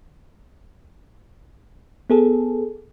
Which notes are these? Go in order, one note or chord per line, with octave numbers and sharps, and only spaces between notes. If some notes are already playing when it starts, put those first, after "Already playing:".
B3 G#4 A4